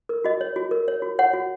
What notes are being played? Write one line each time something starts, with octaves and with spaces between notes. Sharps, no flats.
A#4
F#4 D#5
C#5
F#4
A#4
C#5
F#4
C#5 F#5
F#4